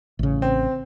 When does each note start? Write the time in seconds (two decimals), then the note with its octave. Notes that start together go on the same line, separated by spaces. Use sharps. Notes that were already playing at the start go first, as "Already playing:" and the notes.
0.19 A1 C#3
0.42 C4